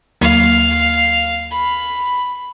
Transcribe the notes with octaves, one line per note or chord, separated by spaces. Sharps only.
D#2 F#3 A#3 F5
B5